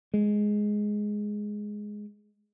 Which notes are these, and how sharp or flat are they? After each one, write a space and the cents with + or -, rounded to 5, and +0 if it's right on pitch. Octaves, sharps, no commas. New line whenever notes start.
G#3 +5